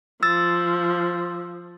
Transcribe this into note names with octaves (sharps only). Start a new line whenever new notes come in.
F3 E6 A6